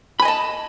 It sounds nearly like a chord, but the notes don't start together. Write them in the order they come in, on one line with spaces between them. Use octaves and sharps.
B5 G#5 D#5 A5